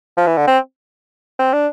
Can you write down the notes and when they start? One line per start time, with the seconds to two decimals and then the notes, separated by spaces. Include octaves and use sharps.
0.17 F3
0.27 E3
0.37 D3
0.47 C4
1.39 C4
1.53 D4